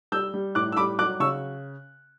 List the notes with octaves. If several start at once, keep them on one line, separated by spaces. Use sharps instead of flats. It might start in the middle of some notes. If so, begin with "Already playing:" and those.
G3 E6 G6
G3
A2 D6 F#6
E6
G3 B5 D6
F#3 D6 F#6
C#3 C#6 E6